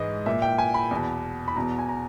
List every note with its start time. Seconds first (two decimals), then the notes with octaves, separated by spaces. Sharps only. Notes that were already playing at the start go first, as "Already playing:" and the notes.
Already playing: G#2 E3 D#5
0.26 A#2 E5
0.42 G5
0.58 G#5
0.74 B5
0.91 E2 B2
1.48 B5
1.56 E2 B2 A#5
1.79 G#5
1.89 A#5